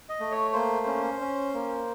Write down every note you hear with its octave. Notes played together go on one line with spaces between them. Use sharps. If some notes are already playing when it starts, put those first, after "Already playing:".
D#5
A3
C#5
A#3 C5
C#4
C#4
A#3